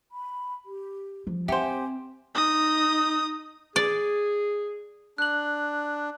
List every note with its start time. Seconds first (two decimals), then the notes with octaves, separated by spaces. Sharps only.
0.12 B5
0.65 G4
1.27 F3
1.48 C4 G4 C5 E5 F#5 G#5 C6
2.35 D#4 D#6
3.76 G#4 D5
5.18 D4 F#6 F#7